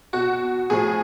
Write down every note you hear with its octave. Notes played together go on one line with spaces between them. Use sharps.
B2 F#4
A2 F3 G#4